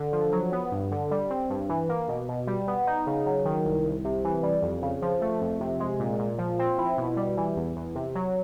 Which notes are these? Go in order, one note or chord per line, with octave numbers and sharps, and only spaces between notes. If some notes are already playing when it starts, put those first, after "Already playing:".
Already playing: D3
F3
F#3
B3
G2
D3
G3
C4
G2
E3
A#3
B2
B2
G3
B3
D#4
C#3
F#3
D#3
C2
C2
C3
E3
G3
F2
C#3
F3
A3
F2
C3
G#3
A#2
A#2
F3
C4
E4
B2
G3
E3
E2
E2
C3
F#3